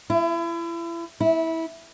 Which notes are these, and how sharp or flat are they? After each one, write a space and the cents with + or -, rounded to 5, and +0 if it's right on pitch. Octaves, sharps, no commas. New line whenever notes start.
E4 +35
E4 -20